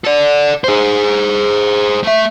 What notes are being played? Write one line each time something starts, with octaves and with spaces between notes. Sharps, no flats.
A4 D5
G#4 C5
A3 E5